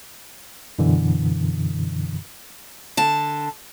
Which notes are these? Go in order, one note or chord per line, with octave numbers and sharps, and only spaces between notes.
F#2 B2 D3 E3
D3 A5